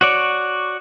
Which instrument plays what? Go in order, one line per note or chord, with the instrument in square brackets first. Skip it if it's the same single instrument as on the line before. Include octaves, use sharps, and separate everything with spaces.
[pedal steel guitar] F#4 C#5 D5